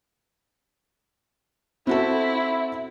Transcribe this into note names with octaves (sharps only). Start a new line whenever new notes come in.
C4 E4 F#4 A4